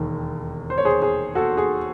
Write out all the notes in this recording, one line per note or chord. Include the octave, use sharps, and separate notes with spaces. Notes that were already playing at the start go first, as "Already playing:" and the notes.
Already playing: E1 D#2 D#3
C5
C#5
G#4 C5
G#4
F#4 A4
G#4